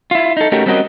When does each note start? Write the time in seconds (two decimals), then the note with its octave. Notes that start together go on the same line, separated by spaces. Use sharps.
0.11 E4 F4
0.37 D#4 A4
0.52 A3 C#4 D#4 F#4 G4 A#4
0.66 G3 C4 C#4 F#4 A#4 D#5